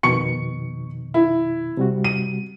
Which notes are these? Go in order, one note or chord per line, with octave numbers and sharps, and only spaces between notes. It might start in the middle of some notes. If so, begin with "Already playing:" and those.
F2 B2 D#3 C#6 C#7
E4
C3 G3 F#4
D#7